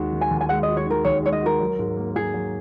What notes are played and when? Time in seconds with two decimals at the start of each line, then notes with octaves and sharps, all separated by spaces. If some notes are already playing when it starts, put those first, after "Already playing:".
Already playing: D#2 D#3 G#3 F#4
0.13 D#3
0.21 G#5
0.31 D#2
0.41 G#5
0.49 G#3 F#5
0.63 D#5
0.68 F#4
0.77 C#5
0.86 D#3 A#4
1.04 D#2 C#5
1.23 G#3 C#5
1.32 D#5
1.41 F#4 A#4
1.60 F#3
1.79 G#2
1.97 A#3
2.15 G#2 G#4
2.34 F#3